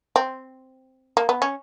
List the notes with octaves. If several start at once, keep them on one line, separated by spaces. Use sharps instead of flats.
C4
A#3
B3
C#4